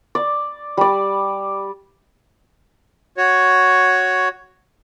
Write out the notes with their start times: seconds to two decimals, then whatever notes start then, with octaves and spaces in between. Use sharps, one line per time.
0.15 D5
0.77 G3 D5
3.18 F#4 C#5